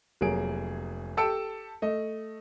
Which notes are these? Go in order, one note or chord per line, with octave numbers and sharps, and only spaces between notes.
F1 F#3 A#3 G#4 D7
G4 A4 A5 E6 C#7 D7
A3 D#5